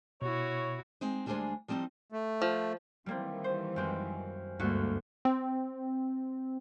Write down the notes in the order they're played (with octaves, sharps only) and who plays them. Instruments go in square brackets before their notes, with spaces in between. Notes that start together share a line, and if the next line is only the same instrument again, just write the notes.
[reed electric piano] B2 [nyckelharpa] E4 F#4 [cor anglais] C#5
[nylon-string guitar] G#3 C4 D#4
D2 G3 G#3 D4 C5 G#5
F3 G3 C4 D4 D#4
[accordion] A3
[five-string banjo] F3
[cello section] D#3 E3 [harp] G3 A#3 C4
[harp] C5
F#2 G#3 C4
[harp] D2 D3 F#4 [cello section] G2 G#3 A#3
[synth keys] C4